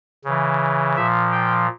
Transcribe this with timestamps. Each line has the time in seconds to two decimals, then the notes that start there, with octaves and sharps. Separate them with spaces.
0.25 C#3 E3
0.97 A#2 F3 E5
1.32 G5